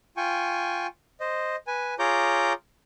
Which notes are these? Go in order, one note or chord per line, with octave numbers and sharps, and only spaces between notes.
F4 G5 G#5 C#6
C5 D#5
B4 G#5
F4 G#4 C#5 A#5 D6 G6